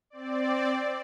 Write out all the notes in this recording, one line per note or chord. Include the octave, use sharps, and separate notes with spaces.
C4 D5